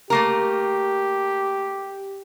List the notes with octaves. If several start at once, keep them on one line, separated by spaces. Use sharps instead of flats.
A3 A#3 G4 A#4